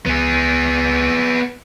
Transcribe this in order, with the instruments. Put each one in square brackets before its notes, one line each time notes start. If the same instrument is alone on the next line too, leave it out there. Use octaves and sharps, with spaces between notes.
[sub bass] C#2 [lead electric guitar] B3 G#4